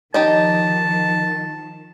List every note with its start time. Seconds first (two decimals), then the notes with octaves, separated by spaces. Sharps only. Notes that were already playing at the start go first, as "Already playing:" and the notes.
0.14 D#3 F3 D#4 G4 D#5 A5